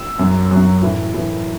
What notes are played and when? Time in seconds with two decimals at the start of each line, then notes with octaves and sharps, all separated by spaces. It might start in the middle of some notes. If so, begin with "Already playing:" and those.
Already playing: E6
0.19 F#2 F#3
0.51 F#2 F#3
0.82 A2 E3
1.14 A2 E3